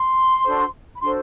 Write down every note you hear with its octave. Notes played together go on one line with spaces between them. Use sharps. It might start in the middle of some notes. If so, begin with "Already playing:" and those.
Already playing: C6
D4 F#4 A4 C5
B5
D4 F#4 A4 C5 C6